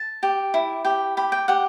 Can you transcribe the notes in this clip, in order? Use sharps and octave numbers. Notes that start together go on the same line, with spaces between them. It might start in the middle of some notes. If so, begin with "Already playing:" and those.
Already playing: A5
G4
E4
G4
G4 B5
G5
G4 F#5